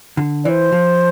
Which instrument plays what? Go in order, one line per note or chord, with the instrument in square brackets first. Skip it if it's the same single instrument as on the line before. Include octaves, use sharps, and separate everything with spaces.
[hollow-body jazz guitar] D3
[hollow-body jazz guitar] E3 [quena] C5 D5
[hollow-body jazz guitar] F3